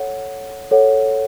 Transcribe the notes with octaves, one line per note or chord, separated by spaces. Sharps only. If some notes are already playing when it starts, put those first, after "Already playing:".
Already playing: A4 C#5 F#5
A4 C#5 F#5